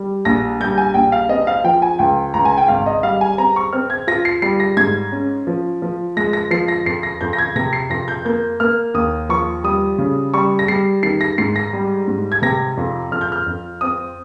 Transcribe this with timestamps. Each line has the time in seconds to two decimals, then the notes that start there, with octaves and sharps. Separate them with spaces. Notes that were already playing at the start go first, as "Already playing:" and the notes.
Already playing: G3
0.25 A#1 A#6
0.60 G3 G6
0.78 G#5
0.94 A#1 G5
1.12 F5
1.29 C4 D#5
1.47 F5
1.64 F3 G5
1.82 G#5
1.99 C#2 G5
2.34 C#2 A#5
2.45 G#5
2.58 G5
2.68 G#1 F5
2.86 D#5
3.03 G3 F5
3.21 G#5
3.38 C4 A#5
3.56 C#6
3.73 C4 F6
3.90 G#6
4.08 F4 A#6
4.25 C7
4.42 G3 C7
4.60 A#6
4.77 G#2 G#6
5.12 C#4
5.47 F3
5.82 F3
6.17 G#3 A#6
6.33 A#6
6.51 F3 C7
6.68 A#6
6.86 F2 C7
7.03 A#6
7.21 F2 G6
7.33 A#6
7.39 G#6
7.56 C3 A#6
7.73 C7
7.90 F2 A#6
8.08 G6
8.25 A#3 G6
8.60 A#3 F6
8.94 D#2 D#6
9.29 F3 C#6
9.64 G3 D#6
9.98 C#3
10.34 G3 C#6
10.59 A#6
10.68 G3 C7
11.03 D#3 C7
11.21 A#6
11.38 G#2 C7
11.56 A#6
11.73 G3
12.08 G#2
12.32 G#6
12.42 C3 A#6
12.77 F2
13.12 F2 F6
13.21 G6
13.32 F6
13.46 F2
13.81 C4 D#6